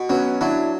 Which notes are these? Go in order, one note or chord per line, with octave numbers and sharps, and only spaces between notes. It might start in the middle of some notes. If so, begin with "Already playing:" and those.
Already playing: B2
F#3 B3 C#4
F#3 D4 E4